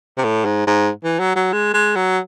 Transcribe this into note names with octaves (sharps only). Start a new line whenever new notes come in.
C3
A2
G#2
G#2
E3
F#3
F#3
G#3
G#3
F#3